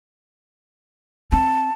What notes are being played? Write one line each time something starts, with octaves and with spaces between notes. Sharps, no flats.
C4 A5